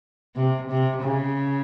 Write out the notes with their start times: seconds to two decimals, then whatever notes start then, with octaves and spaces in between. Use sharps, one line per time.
0.35 C3
0.70 C3
1.03 C#3